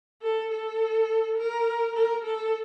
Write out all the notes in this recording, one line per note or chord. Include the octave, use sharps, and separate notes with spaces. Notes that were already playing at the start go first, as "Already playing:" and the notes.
A4
A4
A#4
A#4
A4